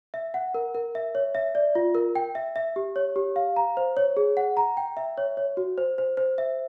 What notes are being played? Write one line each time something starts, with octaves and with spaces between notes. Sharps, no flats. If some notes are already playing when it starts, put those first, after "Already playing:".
E5
F#5
A#4
A#4
E5
C#5
E5
D5
F4
A#4
G5
E5
E5
G4
C#5
G4
F5
A#5
C5
C#5
G#4
F#5
A#5
G5
E5
C#5
C#5
F#4
C5
C5
C5
E5